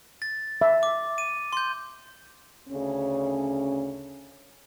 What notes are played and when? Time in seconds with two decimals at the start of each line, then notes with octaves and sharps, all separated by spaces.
0.22 A6
0.61 E5
0.83 D6
1.18 D#7
1.53 C6 G6
2.69 D2 C#3 C#4